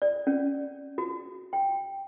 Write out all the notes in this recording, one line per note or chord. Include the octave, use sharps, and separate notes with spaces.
D5
C#4
F#4
G5